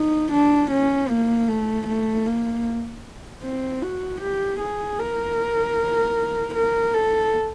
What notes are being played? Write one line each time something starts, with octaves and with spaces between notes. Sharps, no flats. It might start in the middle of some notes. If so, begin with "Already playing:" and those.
Already playing: D#4
D4
C#4
A#3
A3
A3
A#3
C4
F#4
G4
G#4
A#4
A#4
A4